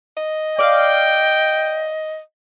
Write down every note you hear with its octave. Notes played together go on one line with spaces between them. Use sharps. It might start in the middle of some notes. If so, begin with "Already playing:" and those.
D#5
D5 F5 G5